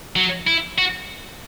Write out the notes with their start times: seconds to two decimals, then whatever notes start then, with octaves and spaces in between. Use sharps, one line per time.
0.16 F#3
0.47 E4
0.78 F#4